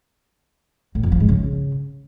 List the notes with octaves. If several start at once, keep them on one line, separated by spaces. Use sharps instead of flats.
A2
F2
F3
G#2
C#3